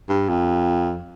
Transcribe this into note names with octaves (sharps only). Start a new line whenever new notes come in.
G2
F2